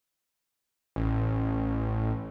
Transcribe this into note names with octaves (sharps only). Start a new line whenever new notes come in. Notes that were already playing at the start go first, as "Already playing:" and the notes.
A1